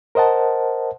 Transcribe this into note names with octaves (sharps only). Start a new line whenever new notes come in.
A#4 C5 D#5 F#5 A5